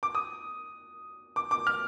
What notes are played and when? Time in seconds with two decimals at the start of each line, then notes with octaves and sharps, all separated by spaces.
0.03 D6
0.15 D#6
1.36 D6
1.51 D6
1.67 F6